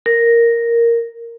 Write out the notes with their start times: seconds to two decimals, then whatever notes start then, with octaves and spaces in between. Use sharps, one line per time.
0.06 A#4